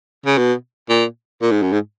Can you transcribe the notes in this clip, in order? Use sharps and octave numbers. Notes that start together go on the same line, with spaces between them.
C#3
B2
A#2
A#2
G#2
F#2
G#2